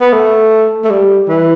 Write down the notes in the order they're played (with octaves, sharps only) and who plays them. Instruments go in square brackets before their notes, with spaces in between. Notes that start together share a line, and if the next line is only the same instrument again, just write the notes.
[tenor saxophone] B3
A3
A3
G3
E3